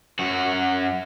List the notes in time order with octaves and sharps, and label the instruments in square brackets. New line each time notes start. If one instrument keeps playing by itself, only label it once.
[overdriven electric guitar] F#2 F#4